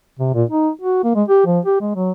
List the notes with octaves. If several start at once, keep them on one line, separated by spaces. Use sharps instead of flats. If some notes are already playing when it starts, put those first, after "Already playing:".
C3
A#2
D#4
F#4
A#3
G#3
G4
F3
G4
G#3
F#3